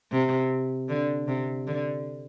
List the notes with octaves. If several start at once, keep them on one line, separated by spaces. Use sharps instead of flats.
C3
D3
C3
D3